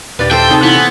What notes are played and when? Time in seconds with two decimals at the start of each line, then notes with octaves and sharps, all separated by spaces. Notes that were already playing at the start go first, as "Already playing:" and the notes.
0.19 D#1 G4 B4 D5 F5
0.31 A3 A4 C5 G5
0.50 C3 D#4 G#4 C#5 E5 A5 D6
0.63 A#2 E3 B3
0.75 G#5